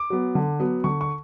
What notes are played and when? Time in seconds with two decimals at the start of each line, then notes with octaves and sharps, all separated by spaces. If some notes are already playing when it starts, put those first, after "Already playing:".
Already playing: D6
0.10 F#3 B3
0.35 D3
0.60 F#3 B3
0.84 D3 C#6
1.01 C#6